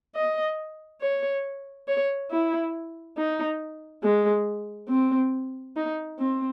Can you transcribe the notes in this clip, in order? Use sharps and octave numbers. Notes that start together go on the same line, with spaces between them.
D#5
C#5
C#5
E4
D#4
G#3
C4
D#4
C4